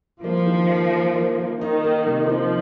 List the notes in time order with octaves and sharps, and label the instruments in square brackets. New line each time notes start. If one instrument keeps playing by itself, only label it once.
[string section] F3 [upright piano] A#3
[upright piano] D#3
A#3
A#3
A#3
A#3
[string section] D#3 [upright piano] D#4
[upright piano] A#3
C3
[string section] F3 [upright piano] D#4